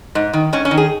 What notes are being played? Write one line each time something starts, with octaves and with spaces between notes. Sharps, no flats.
G#2
D#3
G#2 C#4
C#4
D#3
G#4